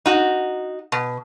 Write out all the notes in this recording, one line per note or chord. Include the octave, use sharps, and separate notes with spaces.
D#4 F#4
B2